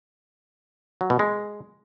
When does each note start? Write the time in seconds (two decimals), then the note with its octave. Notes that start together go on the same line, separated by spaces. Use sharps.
1.01 F#3
1.10 B2
1.19 G#3